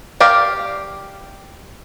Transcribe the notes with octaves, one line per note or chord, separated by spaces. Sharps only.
G4 A#4 D5 F5